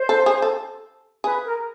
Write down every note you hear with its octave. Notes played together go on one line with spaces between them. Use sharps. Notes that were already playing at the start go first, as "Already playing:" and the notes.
Already playing: C5
A4
G#4
A4
G#4 B4
A#4